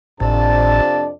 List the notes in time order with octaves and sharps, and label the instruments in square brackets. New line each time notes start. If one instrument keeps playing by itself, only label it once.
[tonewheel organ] G#1 A2 [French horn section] F2 D4 D5 [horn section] C3 A5